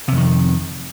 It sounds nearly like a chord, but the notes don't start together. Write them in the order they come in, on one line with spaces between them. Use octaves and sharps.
C3 F2 D#3